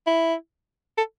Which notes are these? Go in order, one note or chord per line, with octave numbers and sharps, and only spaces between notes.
E4
A4